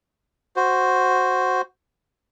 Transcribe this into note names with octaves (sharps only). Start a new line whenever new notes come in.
F#4 C5